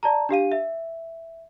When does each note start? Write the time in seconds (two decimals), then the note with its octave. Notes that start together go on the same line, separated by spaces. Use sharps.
0.03 D5 A5 A#5
0.29 D4 G4 F5 D#7
0.52 E5